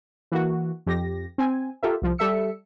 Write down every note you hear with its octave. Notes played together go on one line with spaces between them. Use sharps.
E3 A#3 F#4
F2 G4 A#6
C4 G#5
F4 G4 A4 A#4 E5
C2 F3
G3 A4 E5 E6 C#7